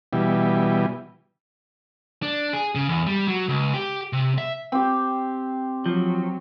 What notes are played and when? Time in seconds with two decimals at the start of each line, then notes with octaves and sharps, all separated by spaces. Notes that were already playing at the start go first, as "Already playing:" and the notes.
0.13 B2 E3 G3
2.22 D4
2.53 G#4
2.75 C#3
2.89 E2
3.07 G3
3.28 F#3
3.49 C#2
3.74 G4
4.13 C3
4.38 E5
4.72 C4 G4
5.86 F3 F#3